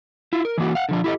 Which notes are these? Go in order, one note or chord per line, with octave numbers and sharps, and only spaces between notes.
E4 F4
A#4
E3 A#3 F#4
F5 F#5
D3 F3 D4
E4 G4 A4 D#5